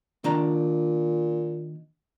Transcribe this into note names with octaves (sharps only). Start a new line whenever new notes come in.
A#2 D#3 D4 A#5